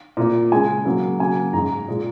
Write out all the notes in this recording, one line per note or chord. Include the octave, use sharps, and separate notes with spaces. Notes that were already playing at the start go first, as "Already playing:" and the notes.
A#2 A#3
C#3 G#3 G#5
C#3 F#3 A#3
C#3 F#3 A#3 G#5
G#2 G#3 A#5
A#2 G#3